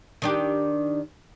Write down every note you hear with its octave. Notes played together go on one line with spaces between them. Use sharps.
D#3 D4 G4